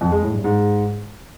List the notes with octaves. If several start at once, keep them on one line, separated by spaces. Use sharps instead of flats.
F2
G#3
A2
G2
G#2